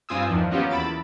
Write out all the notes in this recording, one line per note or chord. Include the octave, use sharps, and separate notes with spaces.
G2 C4 F4 G#5 D#6 E6
E2 D#3 F3 D4
F#3 A#3 B3 C#4 F4 G4
E2 B5 E6 A6 D7